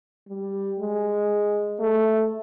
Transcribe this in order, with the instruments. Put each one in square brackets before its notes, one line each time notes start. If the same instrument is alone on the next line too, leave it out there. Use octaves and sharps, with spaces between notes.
[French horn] G3
G#3
A3